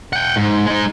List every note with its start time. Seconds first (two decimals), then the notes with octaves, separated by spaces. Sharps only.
0.13 F#5 G5
0.36 G#2
0.66 G#3 D#4